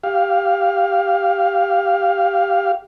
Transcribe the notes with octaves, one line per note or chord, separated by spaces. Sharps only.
G4 F5